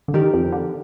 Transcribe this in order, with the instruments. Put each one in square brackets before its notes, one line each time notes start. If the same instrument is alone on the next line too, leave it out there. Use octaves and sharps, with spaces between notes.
[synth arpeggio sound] D3
[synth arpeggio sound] D#3 [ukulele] D#4 G4 A#4 D5
[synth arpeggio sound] F2 F3
D3